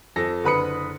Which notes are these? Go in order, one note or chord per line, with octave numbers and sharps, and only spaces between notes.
F2 A4 A#6
F#1 D3 B4 B5 D#6 C#7